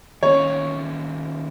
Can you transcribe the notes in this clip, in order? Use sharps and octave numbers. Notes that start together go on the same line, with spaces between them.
D#3 A#3 C#4 C#5